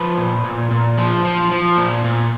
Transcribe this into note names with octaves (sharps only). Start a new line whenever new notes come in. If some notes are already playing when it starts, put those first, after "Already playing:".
Already playing: F3 B4
A#2
A#2
A#2
F3
F3
F3
A#2
A#2